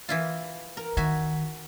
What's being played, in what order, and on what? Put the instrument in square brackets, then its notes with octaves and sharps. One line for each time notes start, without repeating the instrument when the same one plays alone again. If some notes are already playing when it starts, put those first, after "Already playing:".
[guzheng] E3 E4 F4
A#4
[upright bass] D#3 [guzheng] F#4 E5 G#5